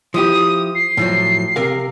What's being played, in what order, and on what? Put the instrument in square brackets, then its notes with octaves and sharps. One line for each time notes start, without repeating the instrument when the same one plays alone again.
[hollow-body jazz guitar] F3 E4 G4 [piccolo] D#6
[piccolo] C7
[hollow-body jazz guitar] A2 F3 F#3
C3 A#4 F5